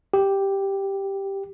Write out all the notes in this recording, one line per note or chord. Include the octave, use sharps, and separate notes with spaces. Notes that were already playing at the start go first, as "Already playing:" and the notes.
G4